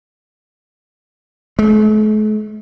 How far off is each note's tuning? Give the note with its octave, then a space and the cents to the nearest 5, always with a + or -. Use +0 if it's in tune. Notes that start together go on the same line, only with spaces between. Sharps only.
A3 -45